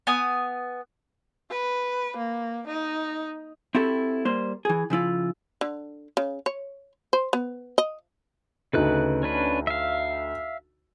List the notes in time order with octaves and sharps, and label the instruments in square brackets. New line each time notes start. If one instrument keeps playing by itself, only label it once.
[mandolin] B3 G#5 D#6
[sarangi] B4
A#3
D#4
[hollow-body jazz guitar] C4 E4 F#4 G4 A4
G3 A#3 C5
E3 G#4
C#3 F3 E4 F4
[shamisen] D3
C#3
C#5
C5
B3
D#5
[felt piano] D2 D#4 A4 [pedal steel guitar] C#3 B4 F#6
[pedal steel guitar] C#4 D4 B4
E5 F5